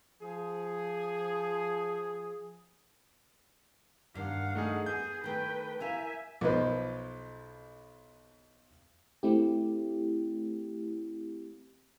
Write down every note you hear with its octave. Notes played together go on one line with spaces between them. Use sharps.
F3 G#4
G2 D#3 F5 F#5
A3 D#4 G#4
B3 G#4 G6
D#3 A3 B4 G5
E4 A#4 E5 F5 G#5
B1 F3 D#4 B4 C5
A3 C4 E4 G4